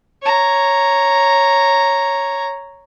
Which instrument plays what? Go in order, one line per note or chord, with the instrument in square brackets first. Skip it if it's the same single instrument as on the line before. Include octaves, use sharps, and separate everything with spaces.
[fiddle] C#5 A#5